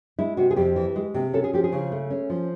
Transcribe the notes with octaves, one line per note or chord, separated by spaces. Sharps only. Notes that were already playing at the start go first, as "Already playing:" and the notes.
G#3 E4
C3 F#4
G#4
F2 G4
E3
G#3
C3
C#4 A4
G#4
F3 G4
G#4
C#3
A3
C#4
F3